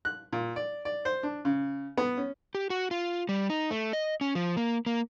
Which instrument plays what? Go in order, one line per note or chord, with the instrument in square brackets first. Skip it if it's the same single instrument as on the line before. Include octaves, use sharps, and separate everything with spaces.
[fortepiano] F#6
A#2
D5
D5
C5
D4
C#3
B3
C#4
[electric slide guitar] G4
F#4
F4
G3
D#4
A3
D#5
C#4
F3
A#3
A#3